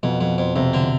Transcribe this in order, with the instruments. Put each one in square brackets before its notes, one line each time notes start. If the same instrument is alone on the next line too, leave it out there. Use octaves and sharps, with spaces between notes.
[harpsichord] F2 [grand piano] B2
[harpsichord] F2
F2
[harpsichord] F2 [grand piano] C3
[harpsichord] D3